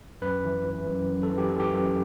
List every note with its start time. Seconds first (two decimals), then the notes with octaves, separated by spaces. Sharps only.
0.22 F#2 B4
0.44 E3
0.66 E3
0.87 F#2
1.09 F#2
1.23 A4
1.31 E3
1.38 G4
1.49 E3 A4
1.60 G4
1.74 F#2